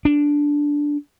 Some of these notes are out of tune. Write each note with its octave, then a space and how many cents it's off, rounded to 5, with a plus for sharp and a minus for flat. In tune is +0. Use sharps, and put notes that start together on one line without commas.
D4 -10